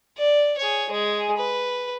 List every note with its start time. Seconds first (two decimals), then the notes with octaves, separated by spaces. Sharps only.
0.18 D5
0.58 G#4 C#5
0.90 G#3 G#4
1.37 B4